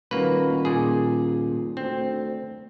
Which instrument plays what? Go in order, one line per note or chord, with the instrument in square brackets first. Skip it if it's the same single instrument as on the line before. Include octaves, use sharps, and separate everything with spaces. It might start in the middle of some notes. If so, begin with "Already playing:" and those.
[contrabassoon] D#1 [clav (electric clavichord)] A#3 F#4 B4
[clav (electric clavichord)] A#2 G#4
[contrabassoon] D2 [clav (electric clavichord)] C4